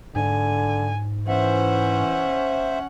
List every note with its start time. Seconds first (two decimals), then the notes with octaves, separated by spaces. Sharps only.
0.16 G#2 D3 G#5
1.28 E3 C#4 C5 E5 F#5